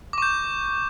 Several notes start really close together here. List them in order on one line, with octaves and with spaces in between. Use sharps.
D6 C#6 G6